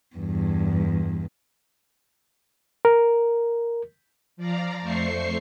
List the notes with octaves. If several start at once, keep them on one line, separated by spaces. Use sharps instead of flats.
E2 G2
A#4
F3 D5 F5 A#5
F2 A3 C5 C#6 C7